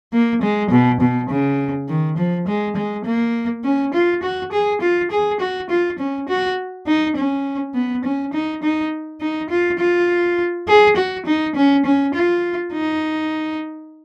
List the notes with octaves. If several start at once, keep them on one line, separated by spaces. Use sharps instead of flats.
A#3
G#3
B2
B2
C#3
D#3
F3
G#3
G#3
A#3
C#4
F4
F#4
G#4
F4
G#4
F#4
F4
C#4
F#4
D#4
C#4
B3
C#4
D#4
D#4
D#4
F4
F4
G#4
F#4
D#4
C#4
C#4
F4
D#4